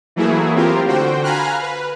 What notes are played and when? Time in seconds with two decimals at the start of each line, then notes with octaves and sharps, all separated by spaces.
0.16 E3 F#3 A3 A#3 E4 G#4
0.55 C4 F4 G4 A#4
0.87 D3 F#4 C5 G5
1.23 F5 G#5 A#5 B5 F6 F#6
1.62 B4